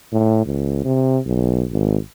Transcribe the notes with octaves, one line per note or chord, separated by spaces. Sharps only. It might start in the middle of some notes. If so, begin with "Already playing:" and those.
A2
C#2
C3
B1
G#1